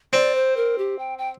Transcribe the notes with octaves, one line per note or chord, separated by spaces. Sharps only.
C4 D5
C5
A#4
G4
G5
G5